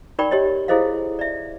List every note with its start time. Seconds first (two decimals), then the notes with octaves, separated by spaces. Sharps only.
0.19 D#4 A#4 D5 G5 B5 C#6
0.31 G4 C#5 D#5
0.68 E4 G#4 A4 C5 D#5 F5
1.19 D5 E5